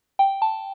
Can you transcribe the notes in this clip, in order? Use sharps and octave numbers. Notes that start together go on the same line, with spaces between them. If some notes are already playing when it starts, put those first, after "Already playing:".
G5
A5